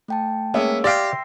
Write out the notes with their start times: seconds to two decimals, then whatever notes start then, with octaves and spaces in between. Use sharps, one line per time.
0.08 A3 G5 A5
0.54 G#3 A#3 B3 C#4 E5
0.84 G4 D5 F5 G5 C6 E6 A#6 C7